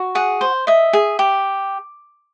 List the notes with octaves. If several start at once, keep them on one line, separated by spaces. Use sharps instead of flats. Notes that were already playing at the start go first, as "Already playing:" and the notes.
Already playing: F#4
G#4 F#5
C5
D#5 E5
G#4
G4